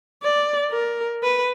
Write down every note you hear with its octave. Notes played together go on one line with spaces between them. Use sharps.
D5
A#4
B4